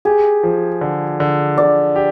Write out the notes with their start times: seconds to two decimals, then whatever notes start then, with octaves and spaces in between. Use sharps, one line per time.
0.05 G4 G#4
0.43 F3
0.81 D3
1.20 D3
1.58 D3 D5
1.96 G4